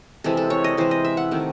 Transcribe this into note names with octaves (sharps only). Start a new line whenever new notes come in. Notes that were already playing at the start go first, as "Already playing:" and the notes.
C3 E3 G#3 A4
A4
C#5
D#5
C3 E3 G#3 C5
D#5
E5
F#5
C3 D#3 A3